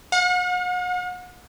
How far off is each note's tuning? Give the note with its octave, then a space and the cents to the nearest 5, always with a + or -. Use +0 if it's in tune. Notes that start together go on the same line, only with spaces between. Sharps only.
F#5 -40